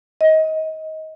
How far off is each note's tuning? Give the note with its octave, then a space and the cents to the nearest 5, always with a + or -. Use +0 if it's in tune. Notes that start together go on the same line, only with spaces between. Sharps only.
D#5 +25